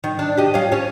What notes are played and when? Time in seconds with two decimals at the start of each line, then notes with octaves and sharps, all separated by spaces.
0.04 D#3
0.19 D4
0.37 G4 D#5
0.54 C#4 F4
0.72 C#4 C#5